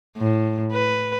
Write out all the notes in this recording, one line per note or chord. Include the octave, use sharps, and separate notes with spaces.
A2
B4